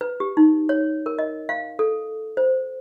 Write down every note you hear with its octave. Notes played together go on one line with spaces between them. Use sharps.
B4
G4
D#4
C#5
A#4
D#5
F5
A4
C5